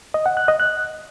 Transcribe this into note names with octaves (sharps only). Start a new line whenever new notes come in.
D#5
F#5
F#6
D#5
F#6